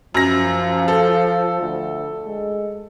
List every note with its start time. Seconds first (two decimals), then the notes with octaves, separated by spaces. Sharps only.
0.14 F#2 F3 A#6
0.88 A4
1.61 D2
2.27 G#3